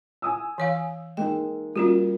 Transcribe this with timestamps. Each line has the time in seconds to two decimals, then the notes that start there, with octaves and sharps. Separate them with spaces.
0.22 G#5 D#6 E6
0.58 E3 C#5 F5
1.17 G#3 A#3 D#4 G5
1.76 G3 A#3 C#4 F4 F#4